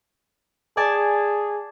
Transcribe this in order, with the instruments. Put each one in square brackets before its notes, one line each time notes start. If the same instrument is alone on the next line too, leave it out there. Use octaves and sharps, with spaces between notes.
[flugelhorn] G#4 [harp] D5 G#5 A5